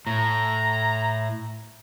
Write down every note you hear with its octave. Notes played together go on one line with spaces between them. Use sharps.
A2 A#5